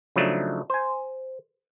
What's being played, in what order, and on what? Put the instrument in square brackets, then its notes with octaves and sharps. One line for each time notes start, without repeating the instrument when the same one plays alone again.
[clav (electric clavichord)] C#3 F3 F#3 A3 D4 D#4
C5 G#5